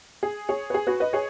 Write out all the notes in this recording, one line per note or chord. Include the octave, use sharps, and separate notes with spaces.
G#4
G#4 C#5
B4
G#4
F#4 B4
B4 D#5
G#4 C#5